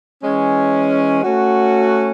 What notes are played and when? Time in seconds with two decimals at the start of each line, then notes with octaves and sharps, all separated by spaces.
0.23 E3 G#3 C#4
1.23 A3 C#4 F#4